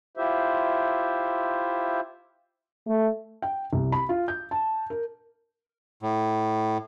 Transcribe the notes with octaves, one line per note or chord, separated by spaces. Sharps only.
E4 F4 G4 C5 E5
A3
G5
C2
B5
F4
G6
A5
A#4
A2